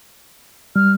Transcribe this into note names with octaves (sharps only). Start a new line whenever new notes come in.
G3 F6